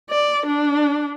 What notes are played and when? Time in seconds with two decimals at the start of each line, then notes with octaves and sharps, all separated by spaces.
0.10 D5
0.47 D4